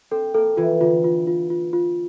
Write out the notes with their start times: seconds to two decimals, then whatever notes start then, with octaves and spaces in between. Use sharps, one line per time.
0.11 C4 A4
0.34 A#3 A4
0.57 E3 F4
0.80 D3 F4
1.04 F4
1.27 F4
1.50 F4
1.73 F4